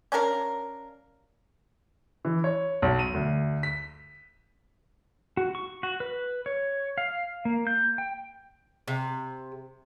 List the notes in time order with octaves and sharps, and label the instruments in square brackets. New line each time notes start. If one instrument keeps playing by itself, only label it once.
[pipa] C#4 D4 A#4 F5
[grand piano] E3
C#5
B1
D#7
D2
B6
[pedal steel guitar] F#4
C#6
F#4
B4
C#5
F5
A#3
G6
G5
[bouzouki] C3